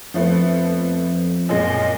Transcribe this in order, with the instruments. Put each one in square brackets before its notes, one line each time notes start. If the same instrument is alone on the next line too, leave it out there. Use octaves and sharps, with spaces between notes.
[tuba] F2 [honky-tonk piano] F3 A3 B3
[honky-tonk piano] F#2 A#2 G#3 [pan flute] D#5